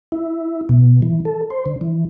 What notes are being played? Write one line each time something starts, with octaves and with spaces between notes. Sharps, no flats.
E4
B2
E3
A4
C5
D3
E3